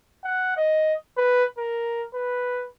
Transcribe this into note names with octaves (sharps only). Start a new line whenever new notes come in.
F#5
D#5
B4
A#4
B4